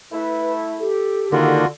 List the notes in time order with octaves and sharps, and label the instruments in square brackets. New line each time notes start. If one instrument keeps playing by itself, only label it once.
[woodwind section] A3 E4 [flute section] B4
[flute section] G4 A4
[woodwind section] D3 [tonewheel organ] D#3 A#3 [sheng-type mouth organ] F4 F#4